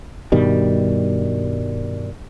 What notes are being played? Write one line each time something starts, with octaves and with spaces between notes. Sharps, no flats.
G2 B2 D#3 G3